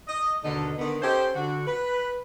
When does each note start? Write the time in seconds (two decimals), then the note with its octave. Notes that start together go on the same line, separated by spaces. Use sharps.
0.07 D#5
0.43 D#2 B2 D3 D#4 A4 D#5
0.78 D3 D#3 B3
1.02 C#4 D#4 G4 A4 C5
1.35 D3 F#4
1.67 B4